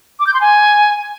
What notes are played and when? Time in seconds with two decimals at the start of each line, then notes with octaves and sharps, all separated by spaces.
0.20 D6
0.27 G6
0.34 C6
0.41 G#5